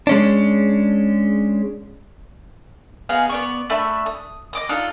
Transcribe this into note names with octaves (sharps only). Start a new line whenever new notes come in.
G#3 C#4 D4
B3 D#4 G#4 F5
B3 D5 C#6
A3 D4 E5 B5
D#6
D#5 D6 D#6
D4 D#4 F4 A4